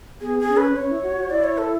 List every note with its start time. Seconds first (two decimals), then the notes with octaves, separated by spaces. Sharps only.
0.20 B3 G#4
0.39 G#4
0.48 C#4
0.57 B4
0.76 C#4 C#5
0.90 E4
1.03 F#4
1.16 F#4
1.30 E4 D5
1.44 C#5
1.58 A4